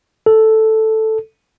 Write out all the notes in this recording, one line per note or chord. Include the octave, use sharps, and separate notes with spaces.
A4